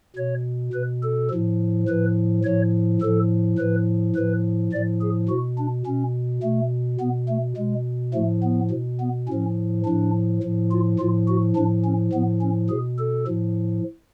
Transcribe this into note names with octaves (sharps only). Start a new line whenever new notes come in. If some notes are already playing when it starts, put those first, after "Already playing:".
B2 C#5
B2 B4
A4
A2 F3
A2 F3 B4
A2 F3 C#5
A2 F3 A4
A2 F3 B4
A2 F3 B4
A2 F3 D5
G#4
B2 F#4
D4
B2 C#4
B2 A3
B2 B3
A3
B2 G#3
A2 F3 A3
B3
B2
B3
A2 F3 C#4
A2 F3 D4
A2 F3
F4
A2 F3 F4
F#4
A2 F3 D4
C#4
A2 F3 B3
C#4
B2 G#4
A4
A2 F3